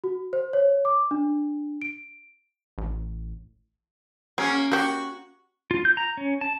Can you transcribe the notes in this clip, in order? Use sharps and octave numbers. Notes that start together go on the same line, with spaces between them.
F#4
C5
C#5
D6
D4
D7
A1
F#3 A#3 C#4 G#4
A#3 F#4 G4
F4
G6
A#5
C#4
A5